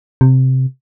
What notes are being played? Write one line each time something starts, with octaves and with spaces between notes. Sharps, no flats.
C3